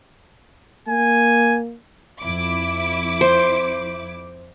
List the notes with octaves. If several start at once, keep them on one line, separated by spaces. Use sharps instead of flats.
A#3 G#5
F2 E4 D6
C5